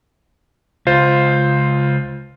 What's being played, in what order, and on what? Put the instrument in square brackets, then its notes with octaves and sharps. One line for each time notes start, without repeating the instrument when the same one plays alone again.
[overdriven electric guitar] C#2 [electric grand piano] F4 C5